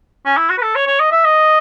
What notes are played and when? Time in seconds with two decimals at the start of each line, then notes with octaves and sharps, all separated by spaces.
0.25 C#4
0.37 E4
0.50 F#4
0.58 B4
0.62 A4
0.75 C#5
0.87 C#5
1.00 D#5
1.12 E5
1.25 D#5